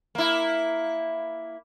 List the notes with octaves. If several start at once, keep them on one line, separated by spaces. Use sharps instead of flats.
A#3 E4